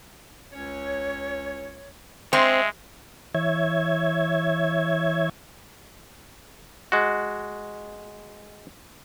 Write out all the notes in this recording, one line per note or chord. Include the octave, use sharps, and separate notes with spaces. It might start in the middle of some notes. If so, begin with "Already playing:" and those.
C#2 C#4 C#5
G#3 C4 E5
E3 C#5 E5 G#6
G#3 F#4